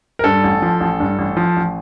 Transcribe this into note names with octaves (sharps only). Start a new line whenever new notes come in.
A#4
G2 A4
A1
F3
A1
G2
A1
F3
A1